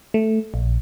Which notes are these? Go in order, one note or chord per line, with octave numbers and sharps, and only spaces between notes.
A3
A#1